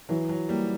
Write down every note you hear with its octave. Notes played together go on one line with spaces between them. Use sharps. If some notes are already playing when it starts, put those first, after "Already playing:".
E3 F#3
F#3
G3 A#3